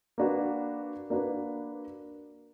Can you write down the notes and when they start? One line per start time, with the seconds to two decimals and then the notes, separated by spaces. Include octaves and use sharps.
0.18 A#3 D4 F#4 B4
1.10 A#3 D4 F#4 B4